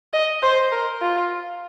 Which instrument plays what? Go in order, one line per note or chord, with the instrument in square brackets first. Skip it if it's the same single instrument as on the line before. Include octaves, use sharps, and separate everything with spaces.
[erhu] D#5
C5
A#4
F4